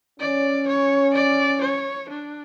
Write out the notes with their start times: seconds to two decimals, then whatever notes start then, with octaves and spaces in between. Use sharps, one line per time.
0.20 C#4 D5
0.68 C#5
1.14 D5
1.61 C#5
2.09 D4